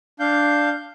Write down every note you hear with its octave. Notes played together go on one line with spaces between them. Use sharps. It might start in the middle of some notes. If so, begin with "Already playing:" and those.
D4 F5 G6